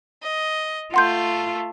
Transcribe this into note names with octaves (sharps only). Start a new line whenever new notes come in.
D#5
A3 F4 F#5 C6 G6